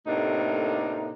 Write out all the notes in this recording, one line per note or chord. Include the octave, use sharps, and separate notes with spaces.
A2 C3 A3 A#3 D4 D#4